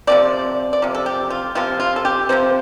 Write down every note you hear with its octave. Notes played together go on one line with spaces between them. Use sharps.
C3 F3 C4 D5
D5
C3 F3
A4
G4
F4
C3 F3 C4 F4
F4
A4
G4
C3 F3 C4 C5